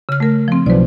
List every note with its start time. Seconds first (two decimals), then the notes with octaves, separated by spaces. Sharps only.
0.09 C#3 F6
0.20 A3 A#4
0.48 F3 C4
0.66 B1 F3 B4 D5